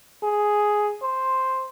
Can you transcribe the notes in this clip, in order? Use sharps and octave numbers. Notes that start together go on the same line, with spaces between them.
G#4
C5